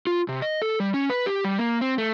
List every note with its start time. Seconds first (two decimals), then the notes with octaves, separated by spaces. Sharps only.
0.07 F4
0.29 C3
0.42 D#5
0.62 A4
0.80 G3
0.94 C#4
1.10 B4
1.26 G4
1.45 G3
1.58 A#3
1.81 C4
1.98 A3